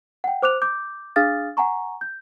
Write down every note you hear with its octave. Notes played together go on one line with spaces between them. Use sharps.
F#5 G5
C5 D6 F#6 F7
D6 G6
D4 G#4 F5 D#6 F6 A6
F#5 G#5 A#5 C#6
G6